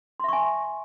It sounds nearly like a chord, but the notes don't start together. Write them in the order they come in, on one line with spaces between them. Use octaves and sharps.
C6 E5 C#6 G#5